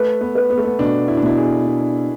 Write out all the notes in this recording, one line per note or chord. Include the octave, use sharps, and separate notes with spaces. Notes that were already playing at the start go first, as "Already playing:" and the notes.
Already playing: A3 B4
B3
B4
B3
A3
B3
B2 D4
E4
D4
B2 E4
G#4
D4